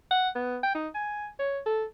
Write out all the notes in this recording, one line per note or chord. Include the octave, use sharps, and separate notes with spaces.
F#5
B3
G5
D#4
G#5
C#5
A4